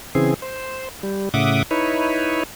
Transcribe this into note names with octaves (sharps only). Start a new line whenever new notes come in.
C#3 E3 C4 G#4
C5
G3
A2 C#3 E5 F#5 D6 D#6
D#4 E4 B4 C#5